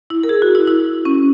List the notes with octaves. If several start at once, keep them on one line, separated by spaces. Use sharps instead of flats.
E4
A#4
G#4
F#4
E4
E4
C#4